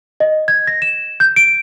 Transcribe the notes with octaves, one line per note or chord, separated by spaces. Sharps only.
D#5
G#6
A#6
E7
G6
D7